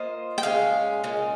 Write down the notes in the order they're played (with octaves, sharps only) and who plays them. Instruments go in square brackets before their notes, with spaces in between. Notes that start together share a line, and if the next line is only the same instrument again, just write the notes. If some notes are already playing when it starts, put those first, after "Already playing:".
Already playing: [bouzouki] A#3 F4 C5 D#5
[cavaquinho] G5
[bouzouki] A#2 G#3 C#4 [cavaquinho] F5
[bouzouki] A#2 G#3 C#4